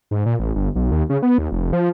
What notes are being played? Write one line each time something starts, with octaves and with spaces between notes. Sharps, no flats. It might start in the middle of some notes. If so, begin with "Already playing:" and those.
G#2
A#2
A1
G1
B1
D#2
C#3
B3
D#2
F1
F3